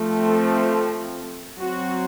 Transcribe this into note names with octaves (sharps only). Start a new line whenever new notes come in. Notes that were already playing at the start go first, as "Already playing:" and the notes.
Already playing: F3 A3 C4
A4
F#3 C4 F#4